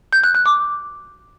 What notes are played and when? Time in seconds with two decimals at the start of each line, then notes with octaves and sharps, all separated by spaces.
0.13 G6
0.24 F#6
0.35 F#6
0.46 D6